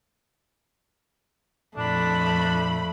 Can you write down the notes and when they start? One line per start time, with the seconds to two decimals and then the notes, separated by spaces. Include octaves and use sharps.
1.77 F2 A#2 A3 D4 B5